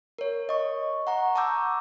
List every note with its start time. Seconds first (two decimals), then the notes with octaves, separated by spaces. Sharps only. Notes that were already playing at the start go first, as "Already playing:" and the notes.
0.19 A#4 C#5
0.49 D#5 C#6
1.07 F#5 A#5 C#6
1.35 A5 A#5 C#6 D6 E6 G6